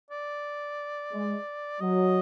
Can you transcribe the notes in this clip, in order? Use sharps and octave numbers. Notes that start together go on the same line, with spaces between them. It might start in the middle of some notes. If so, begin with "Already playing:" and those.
D5
G#3
F#3 D#5